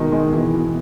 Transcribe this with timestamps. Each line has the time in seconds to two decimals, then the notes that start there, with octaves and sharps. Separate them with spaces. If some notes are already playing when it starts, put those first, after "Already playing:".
Already playing: B2 D#3 G#3
0.12 G#3
0.33 B2 E3
0.54 B2